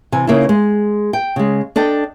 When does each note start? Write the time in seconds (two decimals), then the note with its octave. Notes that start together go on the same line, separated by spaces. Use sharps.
0.12 C3 E3 G#5
0.27 C#3 A#3 D#4 E4
0.49 G#3
1.13 G5
1.36 C#3 G#3
1.76 D4 A4 D#5 G5